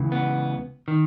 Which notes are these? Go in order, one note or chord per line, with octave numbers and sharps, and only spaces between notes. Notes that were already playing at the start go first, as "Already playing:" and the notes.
Already playing: C#2 C#3 E3
B3
D#3